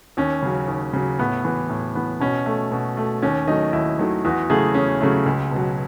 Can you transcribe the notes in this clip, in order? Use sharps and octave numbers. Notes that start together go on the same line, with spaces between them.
D#2 C#4
C#3 F#3
D#2
C#3 F#3
A2 B3
E3 B3
A2
E3 B3
B2 C#4
A3
B2
A3
D#2 C#4
D#3 F#3 A3 D#4
D#2 E4
D#3 F#3 A3
E2 F#4
C#3 F#3 A3 G#4
E2 C#4
C#3 F#3 A3
C#2
B2 F#3